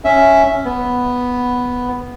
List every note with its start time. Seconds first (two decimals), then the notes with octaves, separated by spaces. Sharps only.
0.04 C#4 E5
0.65 B3